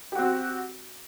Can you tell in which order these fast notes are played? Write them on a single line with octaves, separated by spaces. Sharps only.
G4 F#4 C4